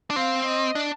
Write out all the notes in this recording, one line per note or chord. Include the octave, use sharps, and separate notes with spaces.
D4
C4 F5
D#5
D4